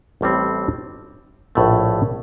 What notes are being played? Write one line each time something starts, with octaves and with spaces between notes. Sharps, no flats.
A1 A2 G3 C4
A#1 A2 A3